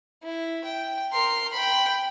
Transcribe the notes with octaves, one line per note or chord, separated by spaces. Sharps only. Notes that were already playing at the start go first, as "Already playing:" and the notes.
E4
G5
A#4 C6
G5 B5